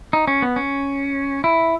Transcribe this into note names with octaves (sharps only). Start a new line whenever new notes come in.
D#4
C#4
B3
C#4
E4